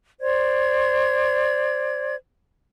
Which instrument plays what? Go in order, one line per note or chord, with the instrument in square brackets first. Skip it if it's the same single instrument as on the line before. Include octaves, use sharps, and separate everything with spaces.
[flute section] C5 D5 G#6